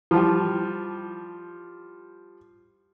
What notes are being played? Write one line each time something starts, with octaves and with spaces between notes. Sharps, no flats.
F3 G3 E4 A5